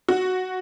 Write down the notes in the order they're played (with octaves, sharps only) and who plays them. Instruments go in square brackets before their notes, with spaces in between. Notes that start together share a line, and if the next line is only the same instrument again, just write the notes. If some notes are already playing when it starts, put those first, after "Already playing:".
[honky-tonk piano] F#4